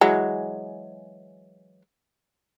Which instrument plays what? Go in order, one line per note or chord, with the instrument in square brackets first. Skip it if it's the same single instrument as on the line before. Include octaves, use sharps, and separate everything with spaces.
[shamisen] E3 F#3 G#3